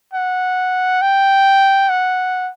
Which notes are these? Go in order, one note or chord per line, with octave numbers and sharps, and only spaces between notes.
F#5
G5
F#5